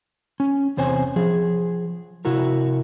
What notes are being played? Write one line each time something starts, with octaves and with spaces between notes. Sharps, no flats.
C#4
E2 C3 C5 C#5 G#5
F3 G#4
C3 E4 F#4 A#4